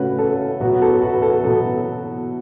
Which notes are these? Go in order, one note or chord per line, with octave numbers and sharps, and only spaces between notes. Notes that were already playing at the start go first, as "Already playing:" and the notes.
Already playing: C#3 A3 C#4 F#4 B4
A4
B2 F#3 B3 F#4
F#4
A4
F#4 B4
A4
B2 F#3 B3 A4